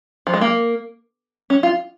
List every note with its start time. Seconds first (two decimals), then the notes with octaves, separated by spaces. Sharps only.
0.27 F3
0.34 G#3
0.41 A#3
1.50 C#4
1.63 F4